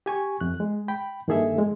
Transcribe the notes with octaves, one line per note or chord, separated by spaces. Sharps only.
G4 G#5 C#6
F2 F#6
G#3
G5 B5
G2 D#3 A#3 G#4 A4 E5
G#3